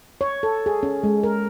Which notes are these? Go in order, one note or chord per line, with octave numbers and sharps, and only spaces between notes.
C#5
A4
G#4
C#4
G#3
A#4